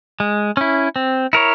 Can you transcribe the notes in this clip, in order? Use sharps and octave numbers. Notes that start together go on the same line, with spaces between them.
G#3
C#4 E4
C4
E4 A#4 C#5